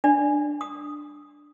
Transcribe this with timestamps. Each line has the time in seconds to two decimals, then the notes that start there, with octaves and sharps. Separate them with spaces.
0.04 D4 D5
0.61 D#6